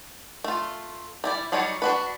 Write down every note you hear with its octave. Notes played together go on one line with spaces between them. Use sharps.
A3 F4
G3 E4 D5
F#3 G3 D#4 C#5 D5
D4 F#4 B4